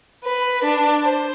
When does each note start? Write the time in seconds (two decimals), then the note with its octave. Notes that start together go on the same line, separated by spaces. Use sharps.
0.22 B4
0.63 D4
1.04 C5